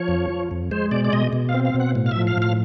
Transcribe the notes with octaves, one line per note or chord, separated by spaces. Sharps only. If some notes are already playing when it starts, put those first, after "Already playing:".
Already playing: F3 C#5
F2
F3
F2
G#3 C5
B2 D5
D5
B2 D#5
B2
F5
C4
F5
B2
F#5
A2
F5
F3 E5
F5
A2 F5